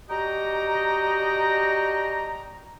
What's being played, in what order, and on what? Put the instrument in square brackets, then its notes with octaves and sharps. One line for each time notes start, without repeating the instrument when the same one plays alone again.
[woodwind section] D4 F#4 G4 D#5 G5 A#5